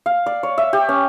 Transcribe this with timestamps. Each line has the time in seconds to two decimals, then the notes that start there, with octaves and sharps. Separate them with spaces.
0.06 F5
0.26 D5
0.43 C#5
0.58 E5
0.73 G4
0.89 C#4